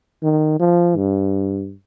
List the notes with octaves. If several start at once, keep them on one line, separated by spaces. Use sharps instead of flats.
D#3
F3
G2